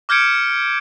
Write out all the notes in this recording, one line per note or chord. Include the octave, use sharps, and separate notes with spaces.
D6 F6 G6 G#6 C#7 D7